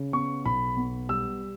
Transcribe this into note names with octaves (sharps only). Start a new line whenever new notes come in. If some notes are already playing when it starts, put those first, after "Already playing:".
Already playing: C#3
B3 C#6
B1 B5
B3
G3 E6